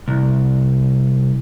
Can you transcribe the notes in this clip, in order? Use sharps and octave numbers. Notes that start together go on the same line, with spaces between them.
C2